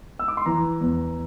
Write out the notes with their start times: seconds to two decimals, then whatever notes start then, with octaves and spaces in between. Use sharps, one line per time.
0.19 E6
0.28 D6
0.37 C6
0.46 E3 A#5
0.81 E2